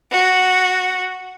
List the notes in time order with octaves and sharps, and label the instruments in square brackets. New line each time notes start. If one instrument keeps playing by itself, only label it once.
[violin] F#4